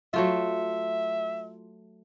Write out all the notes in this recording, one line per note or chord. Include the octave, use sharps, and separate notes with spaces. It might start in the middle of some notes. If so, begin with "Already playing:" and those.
F#3 A3 F4 E5